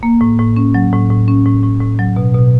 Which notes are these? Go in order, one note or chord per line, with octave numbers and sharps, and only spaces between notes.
A#3
A2
A2
C#4
F#3
A2
A2
C#4
A2
A2
A2
F#3
B2
B2